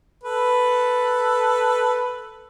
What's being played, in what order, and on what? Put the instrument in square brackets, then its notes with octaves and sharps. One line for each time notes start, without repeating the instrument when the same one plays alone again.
[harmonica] A4 B4